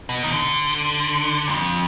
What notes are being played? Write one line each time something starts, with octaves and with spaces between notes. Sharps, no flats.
B2
D#3
D3
F2